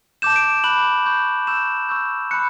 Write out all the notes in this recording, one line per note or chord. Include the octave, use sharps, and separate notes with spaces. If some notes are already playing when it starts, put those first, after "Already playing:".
A5 D6 G6 E7
D7
E7
B5 D6 F#6 F#7
C#6 G6
C#6 E6 G6 E7
C#6 E6 G6
B5 F#6 C#7